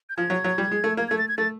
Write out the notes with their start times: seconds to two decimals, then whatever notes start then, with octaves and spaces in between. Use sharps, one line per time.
0.10 G6
0.17 F3 G#6
0.30 F#3
0.44 F#3
0.58 G3
0.71 G#3
0.84 A3
0.97 A#3 G#6
1.08 A3 G#6
1.18 A6
1.28 G#6
1.38 A3 A6